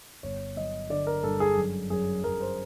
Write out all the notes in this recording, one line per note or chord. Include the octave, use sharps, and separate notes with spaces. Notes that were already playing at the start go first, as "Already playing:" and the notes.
G1 C#5
F#3 D#5
D3 D5
A#4
G2 A4
G#4
F#2
F#2 G#4
F#2 A#4
C5